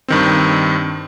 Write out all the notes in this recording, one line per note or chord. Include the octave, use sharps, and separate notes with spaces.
G2 D#3 C4